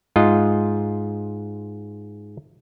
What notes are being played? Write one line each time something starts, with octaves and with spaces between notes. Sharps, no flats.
G#2 F4 D#5